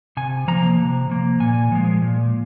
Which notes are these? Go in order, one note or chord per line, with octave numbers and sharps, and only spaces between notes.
C3 G#5
F3 A#3 A#5
C3
F3 A#3
A#2 G#5
F3 G#3
A#2